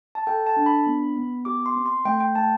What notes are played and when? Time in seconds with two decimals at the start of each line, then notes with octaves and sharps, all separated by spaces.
0.15 A5
0.27 A4 G5
0.47 A5
0.56 D4
0.66 B5
0.86 B3
1.16 B3
1.45 G4 D6
1.66 C6
1.75 C4
1.86 C6
2.05 A3 G5
2.20 G5
2.35 A3 A5